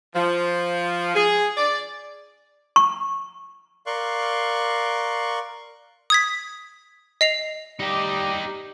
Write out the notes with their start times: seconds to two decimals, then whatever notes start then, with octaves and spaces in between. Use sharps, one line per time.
0.14 F3
1.15 G#4
1.57 D5
2.76 C#6
3.86 A#4 D5 F5 C6 C#6 F#6
6.10 D#6 G#6 B6
7.21 D#5 C7 F7
7.80 G3 D#4 G4 D#5 D6